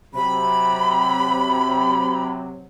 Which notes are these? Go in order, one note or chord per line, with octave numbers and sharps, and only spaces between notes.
C3 F#3 B5